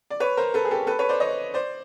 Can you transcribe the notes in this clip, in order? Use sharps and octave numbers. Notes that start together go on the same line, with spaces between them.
D5
B4 C#5
A#4 C5
A4 B4
G#4
G4 A4
A4 B4
B4 C#5
C5 D5
C#5 D#5
C5 D5